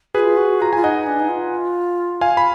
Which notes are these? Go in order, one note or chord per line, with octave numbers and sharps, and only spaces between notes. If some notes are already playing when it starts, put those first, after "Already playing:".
F#4 G#4 B4
F4
F#4
F4 A#5
F4 G#5
D#4 D#5 F#5
D4
D#4
F4
F5 G#5
B5